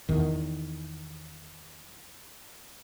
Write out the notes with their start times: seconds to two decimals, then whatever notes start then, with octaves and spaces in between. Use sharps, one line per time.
0.09 E2 D#3